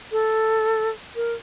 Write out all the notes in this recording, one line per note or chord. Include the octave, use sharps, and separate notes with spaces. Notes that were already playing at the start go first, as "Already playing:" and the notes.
A4
A#4